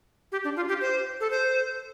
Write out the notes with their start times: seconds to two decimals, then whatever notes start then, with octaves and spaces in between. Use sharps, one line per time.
0.32 G4
0.44 D4
0.56 F4
0.68 G4
0.81 C5
1.21 A4
1.31 C5